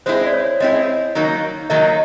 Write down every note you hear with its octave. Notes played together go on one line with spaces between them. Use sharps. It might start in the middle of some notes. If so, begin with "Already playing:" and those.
G#3 C4 E4 G#4 C5
D5
C#5
G#3 C4 E4 G#4 D#5
D#3 F#3 A#3 D#4
D#3 F#3 A#3 D#4 D#5
D#5